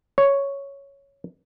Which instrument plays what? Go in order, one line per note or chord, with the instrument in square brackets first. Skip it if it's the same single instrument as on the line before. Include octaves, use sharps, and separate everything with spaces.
[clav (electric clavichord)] C#5